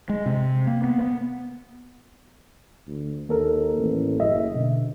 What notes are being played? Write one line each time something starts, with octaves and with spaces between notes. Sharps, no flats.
G#3
C3
A#3
B3
B3
D2
D#2 A#3 A4 A#4
A1
F#1 D#5 E5
B2 D3